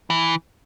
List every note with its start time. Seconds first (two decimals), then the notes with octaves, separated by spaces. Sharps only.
0.10 E3